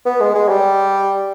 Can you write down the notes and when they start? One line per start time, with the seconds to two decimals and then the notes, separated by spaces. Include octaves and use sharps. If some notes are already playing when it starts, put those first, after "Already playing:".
0.06 B3
0.20 G#3
0.35 G#3
0.49 G3